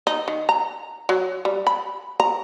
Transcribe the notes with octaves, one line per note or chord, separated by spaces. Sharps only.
D#4
D#3
A#5
F#3
G3
B5
A#5